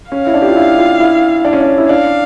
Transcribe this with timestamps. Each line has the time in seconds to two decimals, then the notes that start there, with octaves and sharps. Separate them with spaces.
0.11 C#4 F5
0.27 E4
0.34 D4
0.42 G4
0.48 F4
0.56 E4
0.78 F4
1.00 E4
1.45 D4
1.53 C#4
1.61 D4
1.78 E4
1.89 D4 F5